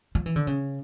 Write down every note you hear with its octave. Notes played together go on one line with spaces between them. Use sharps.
F3
E3
D3
C#3